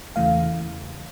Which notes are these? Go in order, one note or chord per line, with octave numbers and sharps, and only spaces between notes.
E2 C#3 E3 A3 F5